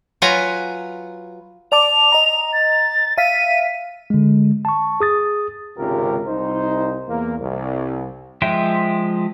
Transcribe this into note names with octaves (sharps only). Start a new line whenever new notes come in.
F#3 F4 B4 G#5 A#5
D5 A5 D6 F7
D#5 A#5
A6
E5 F5 B6 D#7
D3 G#3
A5 C#6
G#4 D#6 A6
G#1 C#2 C3 F4 G4 A#4
C2 D#4 C5
E2 A#3
C2
F3 G#3 E5 G5 C6